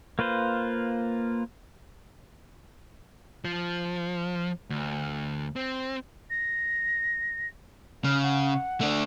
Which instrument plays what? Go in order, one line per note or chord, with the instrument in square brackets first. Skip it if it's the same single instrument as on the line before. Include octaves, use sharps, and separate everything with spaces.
[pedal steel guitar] A#3 F4 B4 C5
[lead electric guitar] F3
D2
C4
[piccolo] A#6
[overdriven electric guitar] C#3 [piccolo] F6
[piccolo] F#5
[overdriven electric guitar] A3 D4